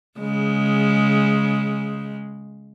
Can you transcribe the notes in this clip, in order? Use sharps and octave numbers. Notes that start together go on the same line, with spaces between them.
C#3 G#3